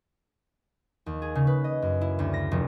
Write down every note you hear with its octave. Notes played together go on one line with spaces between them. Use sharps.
D#2
G#4
C#3
B4
D#5
F#2
E4
D2
A#6
F1